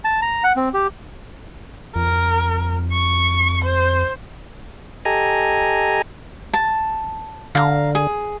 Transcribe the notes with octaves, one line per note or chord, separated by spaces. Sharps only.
A5
A#5
F#5
C4
G4
F2 A#4
C#6
C5
G4 A4 D#5 G#5 A#5
A5
D3 F5 A#5
G#4